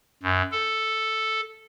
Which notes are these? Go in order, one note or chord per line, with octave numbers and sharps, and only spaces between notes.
F#2
A4